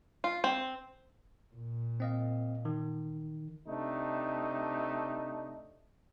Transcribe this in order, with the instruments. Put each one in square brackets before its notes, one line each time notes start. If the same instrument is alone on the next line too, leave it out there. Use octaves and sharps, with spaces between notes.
[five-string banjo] F4
C4
[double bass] A#2
[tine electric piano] C4 D#5 F5
D#3
[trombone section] C3 A3 D4 D#4